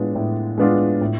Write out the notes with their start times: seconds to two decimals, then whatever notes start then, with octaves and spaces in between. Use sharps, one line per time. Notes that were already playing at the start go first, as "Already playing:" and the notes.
Already playing: A2 G#3 B3 D4 F4
0.15 A2
0.58 G#3 B3 D4 F4
1.01 A2